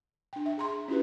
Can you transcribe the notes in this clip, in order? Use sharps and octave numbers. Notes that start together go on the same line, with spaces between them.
D4 G5
E5
G#4 A#5 C6
C#4 E4 F#4 G4 B4